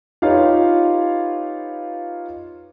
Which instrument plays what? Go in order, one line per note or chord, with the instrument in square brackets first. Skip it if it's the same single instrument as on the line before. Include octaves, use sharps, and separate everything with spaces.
[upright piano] D#4 F4 G4 B4 C#5 F5